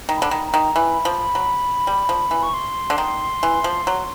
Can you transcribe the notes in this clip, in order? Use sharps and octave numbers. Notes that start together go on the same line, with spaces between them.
D#3
B5
D3
D#3
A#5
D#3
E3 B5
F3
F#3
G3
F3
E3
C#6
C6
D3
D#3
E3
F3
F#3